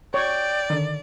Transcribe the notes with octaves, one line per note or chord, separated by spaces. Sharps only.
C#5 D5 G5
D3 D#3